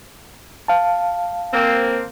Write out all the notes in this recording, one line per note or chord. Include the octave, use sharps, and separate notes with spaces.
F5 A5
A#3 C4